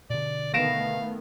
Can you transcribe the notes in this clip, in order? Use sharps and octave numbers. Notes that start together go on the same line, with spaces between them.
B2 D3 D5
D#3 A3 B3 F5 A#6 D7 E7